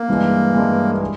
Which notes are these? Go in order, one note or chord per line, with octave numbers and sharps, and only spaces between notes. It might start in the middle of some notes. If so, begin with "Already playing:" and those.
Already playing: A#3
G2 E3 G#3
G2 E3 G#3
G#3